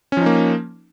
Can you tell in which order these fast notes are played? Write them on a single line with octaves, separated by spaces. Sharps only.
C#4 F3 D#4 A#3